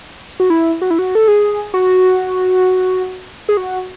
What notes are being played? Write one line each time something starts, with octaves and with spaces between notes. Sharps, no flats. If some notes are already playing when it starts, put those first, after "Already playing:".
F#4
E4
F#4
E4
F#4
A4
G#4
F#4
G#4
F#4